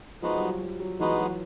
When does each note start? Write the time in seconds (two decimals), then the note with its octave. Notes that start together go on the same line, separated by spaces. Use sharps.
0.22 F3 G#3 B3 D#4 F#4
0.37 G3
0.42 F#3
0.62 G3
0.80 F#3
1.00 E3 G#3 B3 D#4 F#4
1.19 F#3